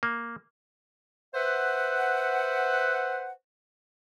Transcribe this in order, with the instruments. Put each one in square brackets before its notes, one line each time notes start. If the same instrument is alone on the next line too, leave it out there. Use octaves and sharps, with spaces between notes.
[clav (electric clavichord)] A#3
[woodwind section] B4 C5 E5 F#5